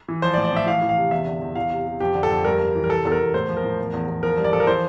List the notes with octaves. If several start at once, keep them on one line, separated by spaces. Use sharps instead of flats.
E3
F3 C5
D5
A2
D5
A2 E5
E3 F5
E3
F5
C3
E2 E5
D3
E2
E3 F5
C3
C3
F2 G4
D3
A4
F2
G2 A#4
G2
E3
A#4
C3 A4
E2 A4
A#4
E2
A2 C5
F3
A#4
A2
E2
E2
E2
F3 A#4
G2
D5
F3 A4
A#4
E3 C5